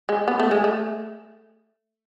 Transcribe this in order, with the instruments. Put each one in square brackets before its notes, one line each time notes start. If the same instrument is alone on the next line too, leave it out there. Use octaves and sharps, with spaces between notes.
[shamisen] G#3
B3
A3
G#3
A3